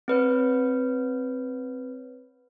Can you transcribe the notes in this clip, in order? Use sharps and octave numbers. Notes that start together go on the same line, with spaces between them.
C4 B4 C#5